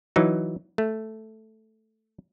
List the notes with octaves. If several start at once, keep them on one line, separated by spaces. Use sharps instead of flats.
E3 F#3 D#4
A3